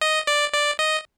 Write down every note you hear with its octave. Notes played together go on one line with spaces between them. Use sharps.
D#5
D5
D5
D#5